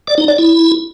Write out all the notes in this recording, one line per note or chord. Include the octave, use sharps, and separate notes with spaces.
D5
D#4
D5
E4